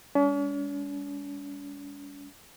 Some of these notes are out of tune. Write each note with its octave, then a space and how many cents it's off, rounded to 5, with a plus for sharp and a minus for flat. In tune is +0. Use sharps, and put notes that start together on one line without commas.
G#3 -40 C#4 +45